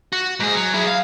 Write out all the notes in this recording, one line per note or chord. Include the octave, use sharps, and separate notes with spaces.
F#4
G#2 G#4
F#3
E4 G#4
F5